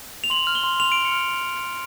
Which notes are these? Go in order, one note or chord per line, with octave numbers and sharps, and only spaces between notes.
F7
C6 F#7
F6
G7
C6
C6 F7
C6 D7
C#7
F6